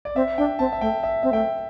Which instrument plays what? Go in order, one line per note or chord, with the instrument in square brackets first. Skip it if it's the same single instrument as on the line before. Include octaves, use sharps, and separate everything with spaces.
[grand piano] D5
[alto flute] C4 [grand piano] E5
[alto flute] D4 [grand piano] G5
[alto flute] C4 [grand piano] A5
[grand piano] E5
[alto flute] A3 [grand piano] G5
[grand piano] E5
[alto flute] C4 [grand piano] E5
[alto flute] A3 [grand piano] G5